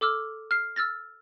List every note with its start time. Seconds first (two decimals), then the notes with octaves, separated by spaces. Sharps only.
0.01 A4 D6 E6 F6
0.51 F6 C7
0.76 E6 F6 A6 A#6